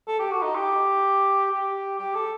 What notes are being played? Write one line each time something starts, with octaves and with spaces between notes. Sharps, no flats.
A4
G4
F#4
D#4
G4
G4
G4
A4